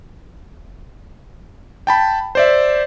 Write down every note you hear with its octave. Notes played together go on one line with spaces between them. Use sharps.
G5 A5 B5
C5 D5 E5